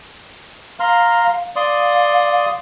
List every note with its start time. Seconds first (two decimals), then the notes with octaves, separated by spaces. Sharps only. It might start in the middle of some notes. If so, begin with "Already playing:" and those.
0.80 F5 A#5 C6 F6
1.56 D5 F5 C6 D#6